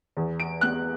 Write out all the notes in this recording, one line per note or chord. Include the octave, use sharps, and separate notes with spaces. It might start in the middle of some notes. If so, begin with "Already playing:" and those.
E2
D7
B3 F#6